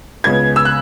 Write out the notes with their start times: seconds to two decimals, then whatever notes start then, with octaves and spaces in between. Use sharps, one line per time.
0.24 C#2 C#3 G#3 B3 G#6
0.56 E6
0.65 F#6